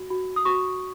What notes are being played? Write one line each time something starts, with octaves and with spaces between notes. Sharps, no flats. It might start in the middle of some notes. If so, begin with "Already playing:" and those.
Already playing: F#4
F#4
D#6
F#4 C#6